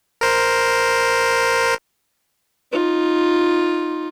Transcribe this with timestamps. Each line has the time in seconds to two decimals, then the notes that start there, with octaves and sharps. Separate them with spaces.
0.21 A#4 C5
2.72 D#4 F4